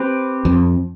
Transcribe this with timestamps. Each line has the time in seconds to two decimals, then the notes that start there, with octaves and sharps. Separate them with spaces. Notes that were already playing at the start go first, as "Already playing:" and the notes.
Already playing: C4 G4 B4
0.45 F2